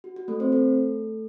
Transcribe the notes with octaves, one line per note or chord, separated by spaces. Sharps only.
F#4
F#4
A3 A4
C4 C5
A3 A4